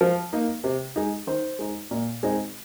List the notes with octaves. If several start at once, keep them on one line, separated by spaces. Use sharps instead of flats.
F3
A#3 D#4
C3
G#3 D#4
D#3 C5
G#3 D#4
A#2
G#3 C4 D#4